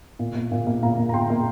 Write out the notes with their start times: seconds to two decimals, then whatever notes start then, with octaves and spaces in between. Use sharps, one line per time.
0.19 A#2
0.35 A#3
0.52 A#2
0.67 A#3
0.82 A#2 F5 A#5
0.98 A#3
1.09 A#5
1.13 A#2 G5 C6
1.30 A#3